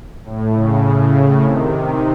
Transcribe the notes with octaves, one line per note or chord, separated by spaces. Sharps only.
A2
C#3
C3 D#3